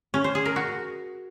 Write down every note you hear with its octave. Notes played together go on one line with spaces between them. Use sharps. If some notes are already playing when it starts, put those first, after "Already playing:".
C#4
C5
G#4
A#4
F#4